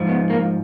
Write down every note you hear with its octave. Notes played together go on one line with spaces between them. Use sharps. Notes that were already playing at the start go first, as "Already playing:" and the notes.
Already playing: G#2 F3
B3
A#3